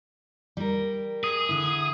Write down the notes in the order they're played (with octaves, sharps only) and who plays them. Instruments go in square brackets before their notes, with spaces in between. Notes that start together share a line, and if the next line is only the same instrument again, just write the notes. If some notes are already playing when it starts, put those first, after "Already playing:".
[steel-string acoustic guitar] G3 A#4
[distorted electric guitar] G#4 [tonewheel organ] D#6
[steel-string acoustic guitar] D3 E4